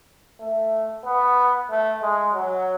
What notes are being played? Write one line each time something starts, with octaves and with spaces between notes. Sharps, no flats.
A3
B3
A3
G#3
F#3